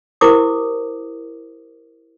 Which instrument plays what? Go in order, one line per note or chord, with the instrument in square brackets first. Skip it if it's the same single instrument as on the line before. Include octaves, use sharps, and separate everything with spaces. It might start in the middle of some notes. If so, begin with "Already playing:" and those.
[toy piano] E4 G4 A#4 C5 D6 D#6